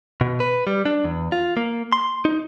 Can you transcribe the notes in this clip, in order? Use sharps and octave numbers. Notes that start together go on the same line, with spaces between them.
B2
B4
G3
D4
E2
F4
A#3
C6
D#4